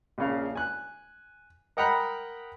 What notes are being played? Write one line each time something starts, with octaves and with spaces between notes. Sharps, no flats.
A#1 C#3 F5
G#5 F#6
A#4 D#5 F#5 G5 A#5 B5